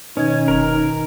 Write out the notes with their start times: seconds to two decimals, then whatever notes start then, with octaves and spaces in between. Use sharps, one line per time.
0.17 B2 D#3 C#4 D#4 G#6
0.48 F1 A#4 A#5